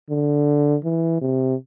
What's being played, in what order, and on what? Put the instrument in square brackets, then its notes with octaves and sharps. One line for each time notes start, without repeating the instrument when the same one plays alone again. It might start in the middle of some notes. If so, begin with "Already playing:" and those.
[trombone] D3
E3
C3